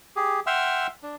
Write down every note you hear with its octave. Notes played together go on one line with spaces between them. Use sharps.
G4 G#4
E5 F#5 G5 C6 E6 F6
D4